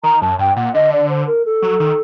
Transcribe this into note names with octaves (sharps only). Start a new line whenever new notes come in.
D#3 A#5
F#2 A5
G2 G5
A#2 F#5
D3 D#5
D5
C5
A#4
A4
F#3
D#3